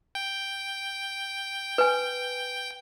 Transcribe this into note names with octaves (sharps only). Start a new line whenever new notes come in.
G5
B4 G#5